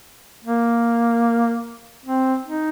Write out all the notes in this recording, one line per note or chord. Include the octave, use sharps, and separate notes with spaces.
A#3
C4
D#4